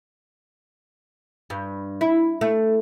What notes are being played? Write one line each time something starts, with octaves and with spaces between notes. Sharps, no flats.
G2
E4
A3